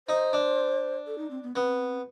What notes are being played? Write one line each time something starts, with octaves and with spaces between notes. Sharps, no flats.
D#4 C5
D4
A4
D#4
C4
B3
B3 C4 C#4